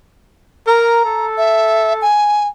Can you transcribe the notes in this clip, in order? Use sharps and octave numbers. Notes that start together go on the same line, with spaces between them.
A#4 A#5
A4
E5
G#5